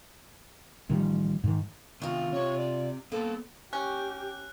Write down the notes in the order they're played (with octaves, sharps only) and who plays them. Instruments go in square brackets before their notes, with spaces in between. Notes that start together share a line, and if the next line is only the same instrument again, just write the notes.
[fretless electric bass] A1 D#3 F3 G3
G#2 D#3
[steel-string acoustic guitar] C3 F4 [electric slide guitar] D#3 B3 F5
[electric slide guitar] C4 G4 [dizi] C#5
[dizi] D5
[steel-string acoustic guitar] A#3 [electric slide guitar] B3 C5 [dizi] A4
[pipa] C#4 [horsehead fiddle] G4 [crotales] F#6